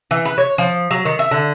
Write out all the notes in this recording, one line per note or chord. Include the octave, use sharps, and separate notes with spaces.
E3
B4
C#5
F3
F#3
D#3
E5
D3